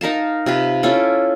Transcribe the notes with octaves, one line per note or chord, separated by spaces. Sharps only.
D#4 A#4 F5 A5
C3 F4 B4
C#4 E4 F4 A4